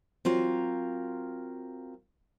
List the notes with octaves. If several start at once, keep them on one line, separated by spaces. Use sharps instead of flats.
F#3 C4 F4 A#4 F5